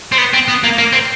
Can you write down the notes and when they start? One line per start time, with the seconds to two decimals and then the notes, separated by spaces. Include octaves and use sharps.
0.12 C4
0.18 B3
0.33 C4
0.48 B3
0.64 A#3
0.78 A#3
0.93 C4